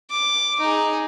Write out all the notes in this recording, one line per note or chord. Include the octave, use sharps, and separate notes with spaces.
D6
D#4 G#4